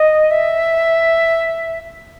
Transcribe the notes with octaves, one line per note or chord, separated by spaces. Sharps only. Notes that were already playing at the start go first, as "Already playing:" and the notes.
Already playing: D#5
E5